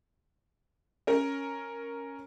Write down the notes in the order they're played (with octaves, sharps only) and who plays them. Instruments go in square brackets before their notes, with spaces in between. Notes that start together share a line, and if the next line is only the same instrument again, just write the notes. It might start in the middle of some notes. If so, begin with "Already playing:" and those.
[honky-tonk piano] C#4 A#4